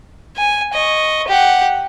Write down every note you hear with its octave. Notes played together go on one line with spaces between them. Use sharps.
G#5
D#5 C#6
G4 F#5